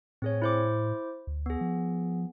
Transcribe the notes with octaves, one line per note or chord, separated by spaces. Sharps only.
A2 C4 G#4 C#5
E4 C5 D6
D2
B3 G#4
F3